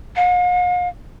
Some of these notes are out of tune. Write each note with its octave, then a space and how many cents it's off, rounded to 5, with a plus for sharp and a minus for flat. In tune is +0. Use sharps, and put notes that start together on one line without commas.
F5 +45